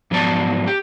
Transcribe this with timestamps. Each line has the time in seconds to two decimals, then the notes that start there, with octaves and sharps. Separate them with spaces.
0.11 G#2 F3 F#3 B3 D5 A5
0.67 G4